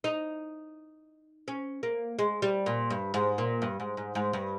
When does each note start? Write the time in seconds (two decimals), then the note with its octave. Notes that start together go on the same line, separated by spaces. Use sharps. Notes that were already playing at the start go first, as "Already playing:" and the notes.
0.04 D#4
1.48 C#4
1.83 A#3
2.19 G#3
2.42 G3
2.66 A#2
2.90 G2
3.14 G#2
3.38 A#2
3.62 G2
3.80 G#2
3.97 G#2
4.15 G#2
4.33 G2